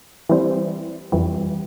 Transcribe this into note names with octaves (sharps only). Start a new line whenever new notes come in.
E3 G3 C4
F2 E3 G3